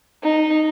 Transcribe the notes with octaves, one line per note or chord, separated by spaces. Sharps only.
D#4